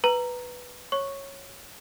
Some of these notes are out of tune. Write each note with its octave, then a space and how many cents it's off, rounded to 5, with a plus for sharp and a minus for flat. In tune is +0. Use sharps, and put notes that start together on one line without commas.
B4 +0 A#5 +0
C#5 -10 C#6 +0